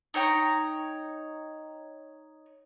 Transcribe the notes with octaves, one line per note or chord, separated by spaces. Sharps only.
D#4 C#5 G5 A#5